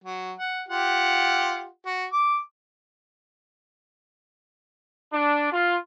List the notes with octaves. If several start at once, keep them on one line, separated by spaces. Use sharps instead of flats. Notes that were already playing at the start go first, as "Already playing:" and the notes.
F#3
F#5
F4 G4 F#5
F#4
D6
D4
F4